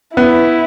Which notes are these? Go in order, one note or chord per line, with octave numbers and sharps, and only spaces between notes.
B3 E4